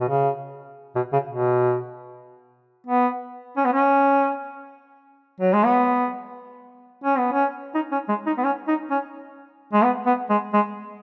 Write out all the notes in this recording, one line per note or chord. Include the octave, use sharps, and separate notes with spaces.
B2
C#3
B2
C#3
B2
B3
C#4
B3
C#4
F#3
G#3
B3
C#4
B3
C#4
D#4
C#4
G#3
D#4
B3
C#4
D#4
C#4
G#3
B3
B3
G#3
G#3